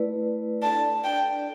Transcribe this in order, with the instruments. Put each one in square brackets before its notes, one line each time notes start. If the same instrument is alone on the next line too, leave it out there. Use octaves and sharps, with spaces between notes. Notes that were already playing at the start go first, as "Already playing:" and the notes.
Already playing: [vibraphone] A3 E4 B4 D5
[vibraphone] D4 A4 D5 [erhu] A5
[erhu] G5